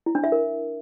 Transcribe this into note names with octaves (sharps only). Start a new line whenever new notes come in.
E4
D4
E5
A#4